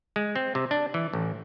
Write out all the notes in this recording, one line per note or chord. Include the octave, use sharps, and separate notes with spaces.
G#3
C4
C3
D4
E3
A1